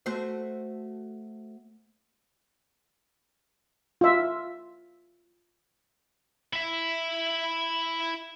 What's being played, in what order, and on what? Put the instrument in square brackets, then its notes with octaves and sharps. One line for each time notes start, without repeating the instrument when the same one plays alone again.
[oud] A3 F#4 C5
[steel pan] F4 E5
[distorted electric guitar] E4 E5